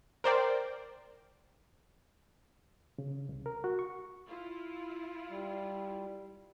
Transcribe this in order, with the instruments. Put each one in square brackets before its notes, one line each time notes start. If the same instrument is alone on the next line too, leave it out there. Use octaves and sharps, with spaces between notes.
[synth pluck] A#4 C5 D5 G5
[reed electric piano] C#3
C2
A#4
F#4
C#6
[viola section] E4 F4
[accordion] G3